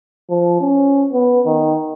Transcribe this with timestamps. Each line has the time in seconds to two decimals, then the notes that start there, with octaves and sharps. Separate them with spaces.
0.30 F3
0.61 C#4
1.13 B3
1.46 D#3